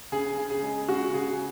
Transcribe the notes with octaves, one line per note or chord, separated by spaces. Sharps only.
C#3 G#4
C#3
G#4
G#3
C#3 F#4
C#3 G#4